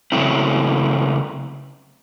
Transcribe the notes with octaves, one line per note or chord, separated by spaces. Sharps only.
C#3 F#3 A3 C4 E4